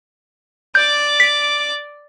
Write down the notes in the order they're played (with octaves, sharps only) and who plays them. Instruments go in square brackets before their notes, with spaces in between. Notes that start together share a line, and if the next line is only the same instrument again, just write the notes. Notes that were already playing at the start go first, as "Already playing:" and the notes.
[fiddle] D5 D6 [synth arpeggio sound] G6
[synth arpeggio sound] B6